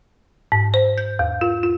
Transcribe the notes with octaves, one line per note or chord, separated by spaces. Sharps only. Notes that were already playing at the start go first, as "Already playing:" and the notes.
G#2
C5
G6
E2
F4
F4